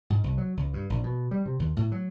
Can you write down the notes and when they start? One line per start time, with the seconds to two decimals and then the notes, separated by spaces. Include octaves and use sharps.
0.10 G#2
0.24 C2
0.38 F#3
0.57 C#2
0.73 G2
0.90 A#1
1.04 B2
1.31 G3
1.46 C3
1.59 D#2
1.77 A2
1.92 F#3